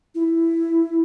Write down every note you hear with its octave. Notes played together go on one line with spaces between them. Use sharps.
E4